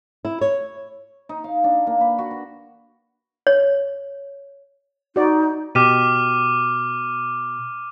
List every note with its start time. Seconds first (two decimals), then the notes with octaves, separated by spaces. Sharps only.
0.25 E4
0.41 C#5
1.29 D#4
1.44 F5
1.64 D4
1.87 A#3
2.01 B4
2.18 F#4
2.31 B4
3.47 C#5
5.16 D#4 F#4 D5
5.75 B2 G4 D6 F6 D#7